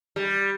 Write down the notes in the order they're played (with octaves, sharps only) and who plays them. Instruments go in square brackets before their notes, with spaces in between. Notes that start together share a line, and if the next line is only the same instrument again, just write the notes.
[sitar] G3